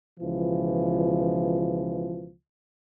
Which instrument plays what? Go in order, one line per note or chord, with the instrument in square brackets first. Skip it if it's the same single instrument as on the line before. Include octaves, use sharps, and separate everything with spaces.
[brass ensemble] C#2 B2 E3 F3